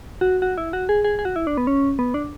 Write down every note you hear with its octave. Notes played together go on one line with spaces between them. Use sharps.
F#4
F#4
E4
F#4
G#4
G#4
G#4
F#4
E4
D4
B3
C#4
B3
D4